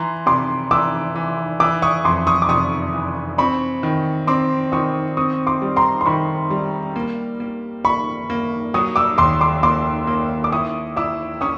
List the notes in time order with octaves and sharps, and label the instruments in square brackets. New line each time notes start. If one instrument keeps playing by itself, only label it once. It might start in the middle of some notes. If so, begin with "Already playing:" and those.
Already playing: [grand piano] E3 [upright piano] A#5 C6
[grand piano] C3 [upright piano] C6 D6
[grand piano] E3 [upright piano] D6 E6
[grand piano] E3
[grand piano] E3 [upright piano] D6 E6
[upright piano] C#6 D#6
[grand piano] F2 [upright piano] C6 D6
[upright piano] C#6 D#6
D6
[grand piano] C3 [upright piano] C#6 D#6
[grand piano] E3
[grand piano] C4 [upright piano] B5 C#6
[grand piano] D#3
[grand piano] C4 [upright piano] C6 D6
[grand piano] D#3 [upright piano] C#6 D#6
[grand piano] C4 [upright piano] C#6 D#6
[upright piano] C6 D6
[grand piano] G3
[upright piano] A#5 C6
C6
[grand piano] D#3 [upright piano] B5 C#6
[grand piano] G3
A#3
A#3
[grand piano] A#3 [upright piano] B5 C#6
[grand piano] A#3
[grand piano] F#3 [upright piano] C#6 D#6
[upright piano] D6 E6
[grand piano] D#2 [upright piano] C6 D6
[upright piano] C6 D6
[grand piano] A#3 [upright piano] C6 D6
[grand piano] A#3
[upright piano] D6
[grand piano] E4 [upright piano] C#6 D#6
[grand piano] E4 [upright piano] D6 E6
[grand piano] C#4 [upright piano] C#6 D#6